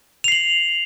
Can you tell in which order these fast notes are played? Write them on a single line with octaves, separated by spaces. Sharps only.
F7 C7 F#7